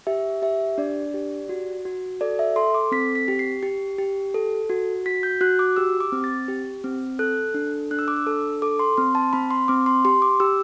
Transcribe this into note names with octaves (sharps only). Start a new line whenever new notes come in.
G4 E5
G4 E5
D4 D5
G4
F#4
F#4
A4 D5
E5
A4 C6
D6
C4 B6
B6
G4
C7
G4
G4
A4
F#4
F#4 B6
G6
F#4 F#6
D6
G4 E6
D6
C4
A6
G4
C4
A4 F#6
D4
D4 F#6
E6
D6
E6
A4
A4 D6
C6
C4 C6
A5
C4 B5
C6
C4 D6
C6
G4 C6
D6
G4 E6